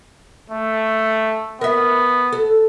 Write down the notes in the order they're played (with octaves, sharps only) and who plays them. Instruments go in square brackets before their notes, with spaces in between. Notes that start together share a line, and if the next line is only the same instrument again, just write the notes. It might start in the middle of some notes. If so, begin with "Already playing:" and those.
[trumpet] A3
[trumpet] B3 [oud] A#4 E5
[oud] A4